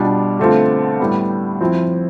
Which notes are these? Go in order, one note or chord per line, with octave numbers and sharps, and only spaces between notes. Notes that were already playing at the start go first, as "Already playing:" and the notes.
Already playing: B2 G3 D4 F4
D3 A3 C4 F4
A2 G3 B3
F3 C4 E4